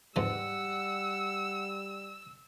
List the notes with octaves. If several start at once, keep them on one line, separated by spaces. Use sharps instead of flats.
F2 G#2 E3 G3 F#5 E6